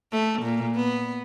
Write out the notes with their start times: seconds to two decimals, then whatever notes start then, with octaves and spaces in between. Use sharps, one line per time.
0.12 A3
0.42 A#2
0.76 B3